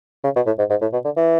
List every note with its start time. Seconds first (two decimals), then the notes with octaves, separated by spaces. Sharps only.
0.24 C#3
0.36 B2
0.46 A2
0.58 G#2
0.70 G#2
0.82 A2
0.93 B2
1.05 D3
1.16 E3